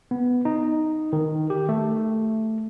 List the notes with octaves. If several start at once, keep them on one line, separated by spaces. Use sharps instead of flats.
B3
D#4
D#3
G4
A3